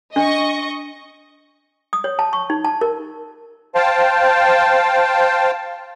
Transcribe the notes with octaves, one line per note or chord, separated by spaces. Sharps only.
D4 D#5 C#6
D#6
C#5
A5
C#6
D#4
A5
A#4
C5 F5 G5 A5